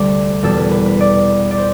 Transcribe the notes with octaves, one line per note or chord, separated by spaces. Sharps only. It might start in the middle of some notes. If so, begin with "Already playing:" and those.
Already playing: D2 C3 G3 C5 D5
E2 B2 G3 A4
B4
B4
B4
D5
D5
C5